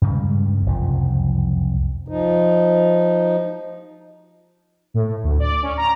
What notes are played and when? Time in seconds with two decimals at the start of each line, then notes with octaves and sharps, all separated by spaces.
0.02 G2 C#3 G3 G#3
0.66 F#1 C2 F2 F3
2.08 F3 D#4
4.94 A2
5.24 D2
5.40 D5
5.63 C#4
5.77 A#5